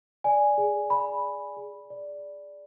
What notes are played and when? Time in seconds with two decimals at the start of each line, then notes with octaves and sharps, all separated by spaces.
0.24 D5 G#5
0.58 G#4
0.90 D5 B5
1.24 D5
1.57 G#4
1.90 D5